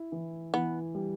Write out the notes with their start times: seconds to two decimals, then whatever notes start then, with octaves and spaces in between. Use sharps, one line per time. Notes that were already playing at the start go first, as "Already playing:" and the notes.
Already playing: E4
0.12 E3
0.53 E3 B3
0.95 G3